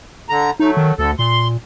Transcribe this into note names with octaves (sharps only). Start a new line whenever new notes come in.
D3 A#5
F#3 A3 D#4
D#3
D2 D3 A4
A#2 C6